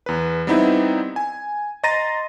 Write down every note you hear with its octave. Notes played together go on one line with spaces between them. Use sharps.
E2 B4
G3 B3 C4 D#4 E4
G#5
D#5 A#5 C6 A6 A#6 D#7